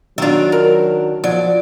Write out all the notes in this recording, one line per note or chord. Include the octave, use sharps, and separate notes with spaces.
D#3 F#3 D4 F4 E5
A#4
F3 F#3 D5